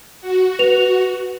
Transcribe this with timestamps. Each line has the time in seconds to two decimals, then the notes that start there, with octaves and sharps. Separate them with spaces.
0.21 F#4
0.59 B4 F7